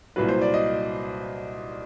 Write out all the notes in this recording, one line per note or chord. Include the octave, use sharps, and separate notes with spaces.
C2 A#2 F#3 B4
C5
D5
D#5